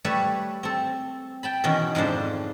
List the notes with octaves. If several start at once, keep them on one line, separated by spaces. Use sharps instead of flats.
G3 A3 A4 B4 C#5
C4 A4
G5 A5 B5
B2 D#3 E3 B3 C#4
F2 G#2 C#3 D4 C5